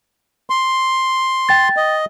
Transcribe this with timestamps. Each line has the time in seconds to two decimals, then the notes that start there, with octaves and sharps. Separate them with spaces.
0.50 C6
1.49 G5 A6
1.76 D#5